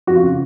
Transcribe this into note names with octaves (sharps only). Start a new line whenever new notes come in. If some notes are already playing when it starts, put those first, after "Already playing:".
F2 F#4
F4
C#3